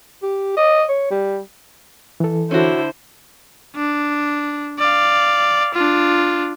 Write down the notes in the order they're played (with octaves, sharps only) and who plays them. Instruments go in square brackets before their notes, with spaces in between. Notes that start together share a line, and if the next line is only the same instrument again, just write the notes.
[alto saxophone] G4
D#5
C#5
G3
[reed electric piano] E3 A4
[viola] D3 C5 [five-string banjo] C#4 F#4 [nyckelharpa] E4
[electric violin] D4
D5 F5
D4 F4